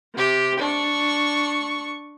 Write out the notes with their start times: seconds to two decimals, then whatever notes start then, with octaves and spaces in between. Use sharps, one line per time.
0.15 C3 G4
0.59 D4 C#6